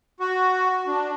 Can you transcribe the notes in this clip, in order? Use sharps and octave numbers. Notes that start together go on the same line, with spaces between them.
F#4
D4